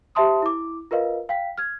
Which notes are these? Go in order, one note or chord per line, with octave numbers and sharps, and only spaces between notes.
G4 C5 E5 A5 C6 D#6
E4 D6
F4 A#4 B4 D#5 F5
F5 G5 B6
F6 G#6